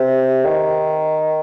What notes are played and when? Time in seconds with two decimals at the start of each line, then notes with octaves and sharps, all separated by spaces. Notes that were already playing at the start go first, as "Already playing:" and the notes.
Already playing: C3
0.45 D#3